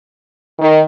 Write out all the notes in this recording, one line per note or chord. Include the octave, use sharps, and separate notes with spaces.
D#3